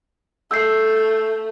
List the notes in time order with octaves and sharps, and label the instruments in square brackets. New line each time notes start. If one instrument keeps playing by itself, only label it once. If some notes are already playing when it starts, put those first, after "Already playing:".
[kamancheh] A3 [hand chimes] E6 G6 C7